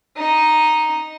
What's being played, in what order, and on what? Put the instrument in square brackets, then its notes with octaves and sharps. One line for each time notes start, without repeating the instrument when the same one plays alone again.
[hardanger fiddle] D#4